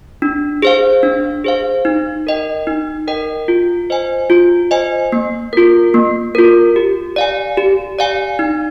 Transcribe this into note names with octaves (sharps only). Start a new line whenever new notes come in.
D4
G#4 C5 F5
D4
G#4 C5 F5
D#4
A#4 D#5 G5
D#4
A#4 D#5 G5
F4
C5 D#5 G#5
F4
C5 D#5 G#5
A#3
F4 A#4
A#3
F4 A#4
G4
D5 F5 G#5
G4
D5 F5 G#5
D#4